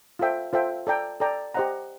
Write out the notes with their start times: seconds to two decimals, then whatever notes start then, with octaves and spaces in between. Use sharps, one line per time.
0.19 F4 A4 C5 E5 G5
0.53 F4 A4 C5 E5 G5
0.87 A4 D5 G5 A#5
1.20 A4 D5 G5 A#5
1.54 G4 C5 D#5 F#5 A#5